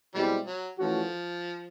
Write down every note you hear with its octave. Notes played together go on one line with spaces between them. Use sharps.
B2 E3 G3 G#3 C4 E4
F#3
E3 F3 A3 C#4 F#4 A4